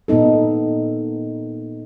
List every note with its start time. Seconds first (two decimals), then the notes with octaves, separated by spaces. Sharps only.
0.08 A#2 A#3 B3 D#4 A4